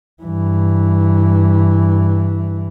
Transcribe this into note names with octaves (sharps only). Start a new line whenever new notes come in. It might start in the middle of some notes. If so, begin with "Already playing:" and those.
G2 E3